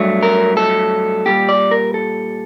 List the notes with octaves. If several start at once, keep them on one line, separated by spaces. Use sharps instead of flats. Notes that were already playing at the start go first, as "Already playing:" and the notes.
Already playing: G2 F#3 A3
A#4
A4
A#2 G3 G4
D5
A#4
A4